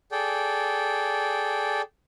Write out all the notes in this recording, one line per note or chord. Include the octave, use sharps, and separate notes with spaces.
G#4 A4 D5 G5